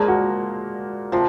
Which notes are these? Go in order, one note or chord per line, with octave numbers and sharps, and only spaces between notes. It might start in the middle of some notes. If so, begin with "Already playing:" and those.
Already playing: A#2 F3 G#3 A#3
F#4
C3 F3 F4